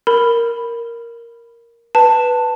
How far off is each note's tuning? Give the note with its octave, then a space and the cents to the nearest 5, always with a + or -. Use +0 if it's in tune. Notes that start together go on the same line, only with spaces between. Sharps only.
A#4 +0 B5 +0
B4 +0 A5 +15